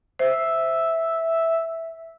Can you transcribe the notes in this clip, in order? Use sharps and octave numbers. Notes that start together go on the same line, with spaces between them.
C5 E5